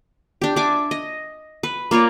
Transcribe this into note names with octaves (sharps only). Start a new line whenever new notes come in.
D4 G4
D4 E5 G#5 D6
D#5
B4
A#3 F4 C#5 D5